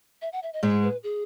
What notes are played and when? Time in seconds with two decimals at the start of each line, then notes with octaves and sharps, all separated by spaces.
0.22 E5
0.32 F#5
0.43 E5
0.53 D#5
0.63 G#2 G#3
0.83 B4
1.03 G#4